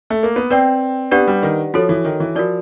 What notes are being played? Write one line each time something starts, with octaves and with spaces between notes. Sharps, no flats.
A3
A#3
B3
C4 B4 D5 G5
B3 D4 G4 B4 D5 F#5
G3
D#3
F3 F#4 A4 C#5
E3
D#3
E3
F3 F#4 A#4 D5